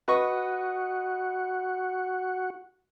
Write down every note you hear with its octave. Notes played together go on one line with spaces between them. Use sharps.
F#4 B4 D#5 C#6